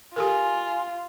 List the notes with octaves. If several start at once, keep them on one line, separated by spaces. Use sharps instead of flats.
F4 G4 A4 A#4 G#5